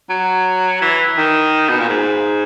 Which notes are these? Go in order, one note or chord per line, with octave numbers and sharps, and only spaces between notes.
F#3
E3
D#3
B2
A#2
G#2